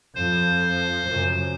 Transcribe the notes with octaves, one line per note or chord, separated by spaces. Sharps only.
F2 F3 C5
F#2 C#3